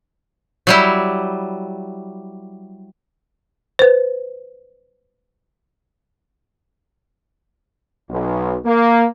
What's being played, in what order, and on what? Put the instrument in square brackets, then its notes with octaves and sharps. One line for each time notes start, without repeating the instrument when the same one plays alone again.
[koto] F#3 G3 E4
[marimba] B4 C5
[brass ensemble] B1
A#3